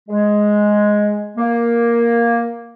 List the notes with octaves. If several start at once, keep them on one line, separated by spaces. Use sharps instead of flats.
G#3
A#3